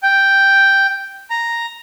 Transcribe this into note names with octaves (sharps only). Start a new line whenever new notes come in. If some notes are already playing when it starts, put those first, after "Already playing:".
G5
A#5